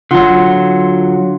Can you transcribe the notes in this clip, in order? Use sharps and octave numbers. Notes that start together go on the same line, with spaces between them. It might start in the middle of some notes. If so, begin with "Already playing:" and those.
D3 F#3 F4 F#5 C6